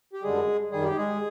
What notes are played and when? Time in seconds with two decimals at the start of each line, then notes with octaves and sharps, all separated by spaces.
0.13 G4
0.23 F#2 D3 G3 G#3 G#4
0.71 F#2 D#3 G3 G#4
0.85 G4
0.96 G#3 G#4